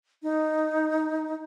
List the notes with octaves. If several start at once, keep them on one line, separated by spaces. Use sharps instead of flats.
D#4